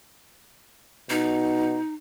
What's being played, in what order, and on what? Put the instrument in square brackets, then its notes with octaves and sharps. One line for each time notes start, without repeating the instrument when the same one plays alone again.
[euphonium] B2 [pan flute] D#4